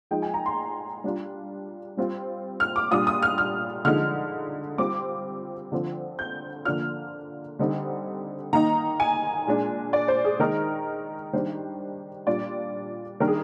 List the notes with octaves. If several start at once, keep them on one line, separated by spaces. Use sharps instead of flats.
F3 G#3 D#4 G5
G#5
A#5
C6
G3 D4 F4
G3 C4 F4
F6
D6
A#2 G3 D4 F4 D#6
D#6
F6
F6
D3 F3 G#3 D#4 F6
G3 C4 F4 D6
D3 F3 C4
G6
D3 F3 A#3 D4 F4 F6
D3 G3 C4 D#4
D#3 A#3 D#4 A#5
G#5
A#2 G#3 D4
D5
C5
G#4
D#3 G#3 D#4 A#4
D#3 G3 D4 C5
A#2 G3 D4 F4 D5
D#3 G3 D4 A#4
G#4